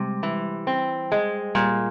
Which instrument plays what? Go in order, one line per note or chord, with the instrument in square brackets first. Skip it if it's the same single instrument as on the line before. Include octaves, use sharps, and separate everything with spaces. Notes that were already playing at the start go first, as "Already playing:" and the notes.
Already playing: [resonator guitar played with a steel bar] C3 [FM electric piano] G3 G#3
[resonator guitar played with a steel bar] E3
C4
G#3
[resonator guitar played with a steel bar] A#2 [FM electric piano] G3